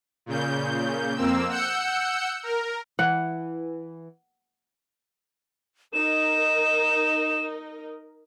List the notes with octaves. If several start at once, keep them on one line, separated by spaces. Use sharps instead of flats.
A#2 C#3 G6
F2 A#3 C4 E6
F#5 E6 G6 C#7
A#4
E3 F#5
D#4 A#4 D#5 E7